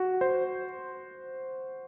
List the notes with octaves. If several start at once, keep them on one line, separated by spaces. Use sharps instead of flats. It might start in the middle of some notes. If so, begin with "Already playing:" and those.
Already playing: F#4
C5